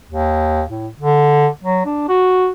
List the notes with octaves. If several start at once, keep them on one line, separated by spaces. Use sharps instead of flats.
D#2
A2
D3
F#3
D4
F#4